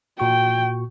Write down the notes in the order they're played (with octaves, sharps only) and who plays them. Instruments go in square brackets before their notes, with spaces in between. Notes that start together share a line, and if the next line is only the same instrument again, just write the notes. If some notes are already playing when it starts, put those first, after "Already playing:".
[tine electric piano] A#2 F#4 C#6 [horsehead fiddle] G5